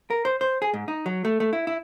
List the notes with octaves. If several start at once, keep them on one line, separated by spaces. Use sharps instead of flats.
A#4
C5
C5
G#4
G#2
D#4
F#3
A3
A3
E4
E4